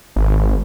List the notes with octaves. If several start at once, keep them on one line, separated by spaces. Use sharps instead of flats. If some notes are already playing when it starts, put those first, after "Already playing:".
G#1